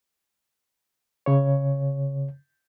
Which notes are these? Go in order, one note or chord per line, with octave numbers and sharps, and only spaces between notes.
C#3 C#5